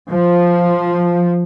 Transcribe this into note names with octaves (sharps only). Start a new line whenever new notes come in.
F3